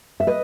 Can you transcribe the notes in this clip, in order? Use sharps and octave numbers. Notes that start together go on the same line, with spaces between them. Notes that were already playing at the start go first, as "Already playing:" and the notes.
E5
B4 D#5